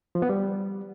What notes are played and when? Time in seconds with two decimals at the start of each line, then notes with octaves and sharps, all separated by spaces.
0.15 F3
0.22 B3
0.29 G3